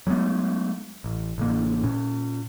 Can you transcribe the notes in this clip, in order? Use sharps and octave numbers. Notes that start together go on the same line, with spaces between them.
F#3 G#3 A3 B3
A1
A1 C#3 A#3
A#2 C#4